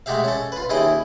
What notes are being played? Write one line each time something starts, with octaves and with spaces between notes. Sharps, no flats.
G#3 A3 F#4 G4 E5 F5
C#4 A4
F4 B4
D#2 C#4 E4 G#4 D#5 G5